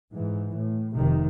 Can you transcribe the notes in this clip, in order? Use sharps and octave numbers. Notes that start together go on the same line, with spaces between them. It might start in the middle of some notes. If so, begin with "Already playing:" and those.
G#2 E3
A2
F1 C3 D#3